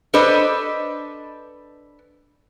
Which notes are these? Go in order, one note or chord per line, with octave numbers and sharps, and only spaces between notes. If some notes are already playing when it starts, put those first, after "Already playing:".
D4 A4 B4 C5 D#5